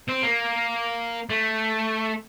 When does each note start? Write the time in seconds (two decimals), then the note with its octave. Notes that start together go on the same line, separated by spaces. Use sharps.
0.09 C4
0.23 A#3
1.30 A3